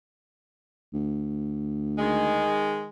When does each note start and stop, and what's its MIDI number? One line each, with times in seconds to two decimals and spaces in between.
0.94 2.48 38
1.99 2.88 51
1.99 2.88 56